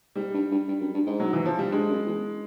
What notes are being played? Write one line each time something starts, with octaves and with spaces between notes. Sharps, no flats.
G#2 G3
G2
G2
G2
F#2
G2
G#2
F#3
E3
F3
G3
G2 G#3
F#2
E2